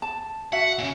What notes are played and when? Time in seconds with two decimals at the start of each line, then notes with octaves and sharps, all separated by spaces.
0.02 A5
0.52 F#4 E5 F#5
0.78 A#2 C#3